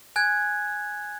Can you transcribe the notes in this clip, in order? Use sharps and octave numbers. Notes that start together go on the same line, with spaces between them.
G#5 F#6 G#6